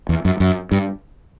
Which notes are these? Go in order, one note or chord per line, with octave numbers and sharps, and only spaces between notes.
E2
F#2
F#2
G2